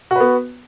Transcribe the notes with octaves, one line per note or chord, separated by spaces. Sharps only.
B3 F#4 B4